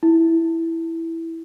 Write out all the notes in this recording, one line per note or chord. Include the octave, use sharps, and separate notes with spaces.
E4